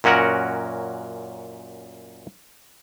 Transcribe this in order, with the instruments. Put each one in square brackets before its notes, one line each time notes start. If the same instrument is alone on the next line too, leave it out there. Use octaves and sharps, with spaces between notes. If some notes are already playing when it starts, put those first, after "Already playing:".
[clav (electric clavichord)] F#2 A#2 C#4 F#4 A#4 F#5